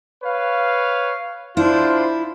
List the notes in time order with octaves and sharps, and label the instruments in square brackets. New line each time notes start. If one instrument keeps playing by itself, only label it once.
[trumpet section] B4 C#5 F5
[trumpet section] D4 F4 C5 [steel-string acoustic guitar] E4